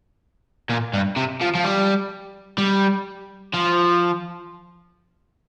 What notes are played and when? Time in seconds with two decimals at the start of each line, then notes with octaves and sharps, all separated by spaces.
0.69 A#2
0.93 G2
1.16 C3
1.41 F3
1.55 F3
1.64 G3
2.58 G3
3.53 F3